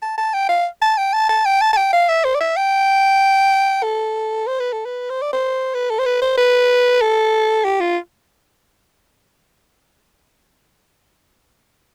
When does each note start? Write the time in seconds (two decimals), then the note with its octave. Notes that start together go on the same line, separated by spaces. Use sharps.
0.02 A5
0.18 A5
0.34 G5
0.49 F5
0.82 A5
0.97 G5
1.13 A5
1.29 A5
1.45 G5
1.61 A5
1.73 A5
1.77 G5
1.93 F5
2.09 E5
2.25 C5
2.35 D5
2.40 E5
2.56 G5
3.83 A4
4.47 C5
4.60 B4
4.73 A4
4.85 B4
5.10 C5
5.22 D5
5.33 C5
5.74 B4
5.90 A4
5.99 C5
6.06 B4
6.22 C5
6.38 B4
7.01 A4
7.65 G4
7.80 F4